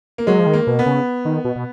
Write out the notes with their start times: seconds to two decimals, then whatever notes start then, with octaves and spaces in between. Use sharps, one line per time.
0.18 A#3
0.27 F#3 G#3
0.39 F3
0.46 D#3
0.53 A#3
0.67 B2
0.79 B3
0.86 C#3
1.25 D#3
1.45 B2
1.56 B2